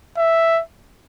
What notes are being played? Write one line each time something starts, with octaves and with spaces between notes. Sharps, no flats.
E5